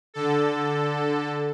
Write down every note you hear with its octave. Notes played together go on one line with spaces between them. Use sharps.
D3 A4